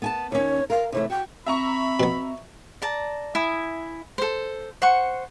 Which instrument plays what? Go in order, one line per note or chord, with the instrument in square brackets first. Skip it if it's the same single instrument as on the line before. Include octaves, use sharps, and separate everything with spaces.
[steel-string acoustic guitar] B3 G#5 A5
[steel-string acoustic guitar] D#2 C#4 [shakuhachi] C#5
[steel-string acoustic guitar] A#4 [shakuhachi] F5
[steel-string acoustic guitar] C3 E3 A3 [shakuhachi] C#5
[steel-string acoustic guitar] F#4 [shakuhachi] G5
[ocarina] C4 [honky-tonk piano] E5 A#5 C#6 [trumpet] B5
[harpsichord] B2 B3
[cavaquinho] D5 A5 A#5
E4 E5 G#5 D#6
A4 C5
C5 F#5 C#6